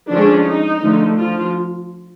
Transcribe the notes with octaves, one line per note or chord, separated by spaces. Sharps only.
D3 F3 G#3 C#4 D4
D#4
D3 F3 A3
F3 F4